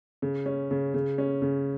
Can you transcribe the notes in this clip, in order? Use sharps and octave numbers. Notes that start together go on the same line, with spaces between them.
C#3
C#4
C#3
C#3
C#4
C#3